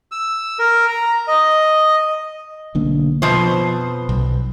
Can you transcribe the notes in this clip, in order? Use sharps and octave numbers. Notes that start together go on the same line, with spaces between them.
E6
A#4
A#5
D#5
B1 D3 A#3
F2 B2 F3 C5
B1